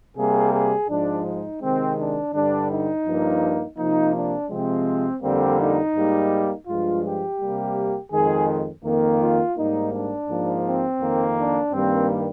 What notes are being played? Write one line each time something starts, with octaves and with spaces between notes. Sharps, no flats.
C3 G3 A#3 G#4
G#4
G#2 F3 G#3 D4
D#4
C3 D#3 G#3 C4
D4
G2 D3 G3 D4
D#4
G2 F3 A#3
C3 F3 A#3 D#4
D4
C3 F3 G#3 C4
F2 D3 G3 A#3 C4
D#4
G#2 G3 A#3
G2 F3 G#3 F4
G4
C3 G3 A#3
F2 D#3 G#3 G#4
F2 D#3 A#3
F4
G#2 G3 A#3 D#4
D4
G#2 F3 A#3
C4
F2 D#3 A#3
D4
G2 D#3 G3 A#3 C4